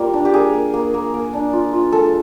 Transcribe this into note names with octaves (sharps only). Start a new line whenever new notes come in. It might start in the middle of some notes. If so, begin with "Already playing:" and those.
Already playing: G3 A#3 F4
D4
G4
A#3 G#4
A#3
A#3
A#3
A#3
D4
F4
F4
G#3 A4